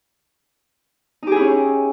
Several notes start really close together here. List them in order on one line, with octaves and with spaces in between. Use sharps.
D#4 G4 G#4 E4 C#4